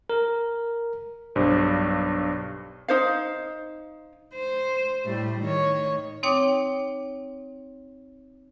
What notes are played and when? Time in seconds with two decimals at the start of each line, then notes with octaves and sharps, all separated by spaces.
0.10 A#4
1.35 B1 G2 C5
2.88 D#4 C5 F5
4.34 C5
5.05 A2 G3 A3
5.40 D#3 C#5
6.23 C4 D#4 C#5 G5 D6